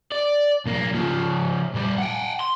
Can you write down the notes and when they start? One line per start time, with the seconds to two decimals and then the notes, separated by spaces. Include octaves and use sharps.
0.12 D5
0.66 B1 A#3
0.94 C#3 F3
1.74 A#2 G3
1.98 F#5 G5
2.41 C6